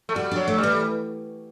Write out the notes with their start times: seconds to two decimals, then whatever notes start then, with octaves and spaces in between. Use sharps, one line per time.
0.09 A3
0.15 G3 F#4
0.31 F#3 D4
0.48 A3
0.58 G3
0.63 E3